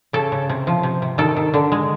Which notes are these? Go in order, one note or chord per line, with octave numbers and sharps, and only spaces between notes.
C#3 A4
C#3
C3
F3
C3
C3
D#3 A4
D#3
D3
G#3